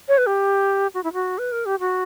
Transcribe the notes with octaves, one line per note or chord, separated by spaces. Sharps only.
C#5
B4
G4
F#4
E4
F#4
B4
A#4
G4
F#4